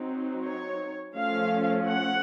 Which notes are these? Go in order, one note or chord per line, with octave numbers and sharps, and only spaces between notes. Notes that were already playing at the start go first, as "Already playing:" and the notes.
Already playing: F#3 C4 D#4
C#5
F3 A3 C#4 F5
F#5